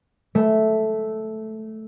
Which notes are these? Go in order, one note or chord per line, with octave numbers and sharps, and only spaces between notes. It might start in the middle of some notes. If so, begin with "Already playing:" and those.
A3